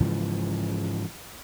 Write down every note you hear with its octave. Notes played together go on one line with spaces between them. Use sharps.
G#2 C#3 E3 F3